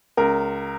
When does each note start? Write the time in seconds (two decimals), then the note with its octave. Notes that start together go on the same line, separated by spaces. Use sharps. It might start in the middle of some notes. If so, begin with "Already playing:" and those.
0.17 C#2 A#4